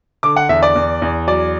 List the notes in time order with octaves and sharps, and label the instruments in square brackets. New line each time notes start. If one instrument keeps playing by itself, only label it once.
[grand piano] D3 D6
F#5
E2 E5
D5
E2
E2
F#3 D5